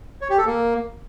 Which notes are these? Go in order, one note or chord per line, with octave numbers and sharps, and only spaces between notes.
C#5
G4
A4
A#3